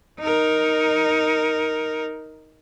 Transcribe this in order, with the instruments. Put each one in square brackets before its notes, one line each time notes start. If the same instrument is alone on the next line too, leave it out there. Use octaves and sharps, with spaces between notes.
[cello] D#4 A#4